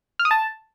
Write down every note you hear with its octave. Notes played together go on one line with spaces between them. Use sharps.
F6
D#6
A5